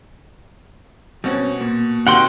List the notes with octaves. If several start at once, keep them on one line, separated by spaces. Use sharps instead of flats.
B2 G3 C4 C#4 F#4
A#2
C3 D#3 F#4 F#5 G5 C6